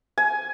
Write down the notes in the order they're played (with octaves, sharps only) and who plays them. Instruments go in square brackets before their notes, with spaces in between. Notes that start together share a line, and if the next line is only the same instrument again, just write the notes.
[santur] G#5